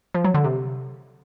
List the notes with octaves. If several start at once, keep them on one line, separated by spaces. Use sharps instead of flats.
F3
F#3
D3
C3